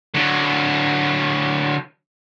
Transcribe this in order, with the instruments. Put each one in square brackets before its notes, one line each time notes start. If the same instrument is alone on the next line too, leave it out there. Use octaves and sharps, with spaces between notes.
[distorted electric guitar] D3 F#3